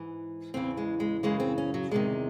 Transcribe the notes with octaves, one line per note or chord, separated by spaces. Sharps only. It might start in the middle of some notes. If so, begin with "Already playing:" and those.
Already playing: G#2 E3
E2 C#3 E3 C4
G#3
G#3
F#2 C#3 E3 G#3
C4
C#4
F#3
E2 C3 D#3 G#3